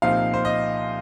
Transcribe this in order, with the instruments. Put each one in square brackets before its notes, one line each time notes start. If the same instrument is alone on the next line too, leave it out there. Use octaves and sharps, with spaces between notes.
[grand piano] C2 A#2 F3 C4 D#4 F5
C5
D#5